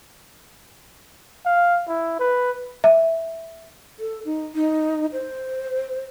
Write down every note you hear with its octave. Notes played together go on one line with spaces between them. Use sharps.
F5
E4
B4
E5
A4
D#4
D#4
C5